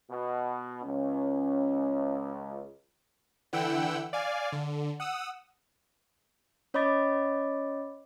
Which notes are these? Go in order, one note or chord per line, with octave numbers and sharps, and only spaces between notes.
B2
C#2 C#4
D3 E3 E4 F#5 G5 E6
D5 F5 G#5
D3
F#5 D#6 E6
C#4 C#5 D#5 B5 D6 A6